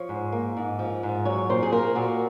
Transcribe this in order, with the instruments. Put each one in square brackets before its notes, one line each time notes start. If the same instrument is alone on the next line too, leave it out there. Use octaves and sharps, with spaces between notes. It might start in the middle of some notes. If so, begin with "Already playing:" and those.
Already playing: [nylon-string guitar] F3 C#5
G#2
A#3
G#2
F3
G#2
F#3 C#5
A#2 C5
G#4
A#3 A#4
A#2 F#4